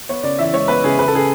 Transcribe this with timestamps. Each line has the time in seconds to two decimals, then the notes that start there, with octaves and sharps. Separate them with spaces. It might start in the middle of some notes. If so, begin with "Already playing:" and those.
0.09 B3 C#5
0.23 C#3 D5
0.39 E3 E5
0.53 G#3 C#5
0.68 B3 B4
0.84 C#3 G#4
0.98 C#3 B4
1.08 A4
1.13 C#3 G#4